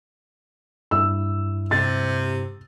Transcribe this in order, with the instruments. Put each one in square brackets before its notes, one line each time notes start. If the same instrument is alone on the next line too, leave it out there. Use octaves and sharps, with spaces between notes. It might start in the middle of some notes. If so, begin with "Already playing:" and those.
[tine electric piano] G2 E4 [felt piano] E6
[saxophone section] C3 [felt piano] A6